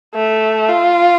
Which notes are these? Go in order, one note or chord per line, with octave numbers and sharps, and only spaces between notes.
A3
F4